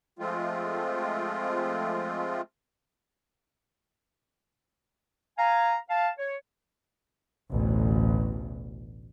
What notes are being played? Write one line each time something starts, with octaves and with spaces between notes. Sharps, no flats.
F3 G#3 A3 C4 F4
F5 G#5 A#5
F5 A5
C#5
A1 D2 B2